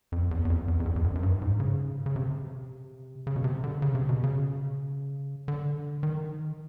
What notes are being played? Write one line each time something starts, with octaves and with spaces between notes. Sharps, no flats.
F2
E2
E2
F2
E2
F2
E2
F2
F#2
F#2
G2
G#2
C#3
C#3
C3
C#3
B2
C3
D3
C#3
C3
B2
C#3
D3
D#3